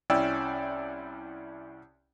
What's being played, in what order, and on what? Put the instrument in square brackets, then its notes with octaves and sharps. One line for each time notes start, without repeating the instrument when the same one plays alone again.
[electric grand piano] C2 C#4 E4 D5 G5 E6